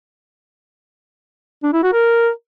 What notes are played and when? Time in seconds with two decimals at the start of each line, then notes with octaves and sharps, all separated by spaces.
1.63 D4
1.73 E4
1.83 F#4
1.93 A#4